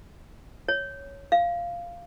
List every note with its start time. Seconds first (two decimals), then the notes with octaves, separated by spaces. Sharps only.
0.69 C#5
1.32 F5